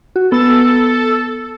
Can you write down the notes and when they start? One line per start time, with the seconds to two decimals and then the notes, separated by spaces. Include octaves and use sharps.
0.16 F#4
0.32 B3 A4 E6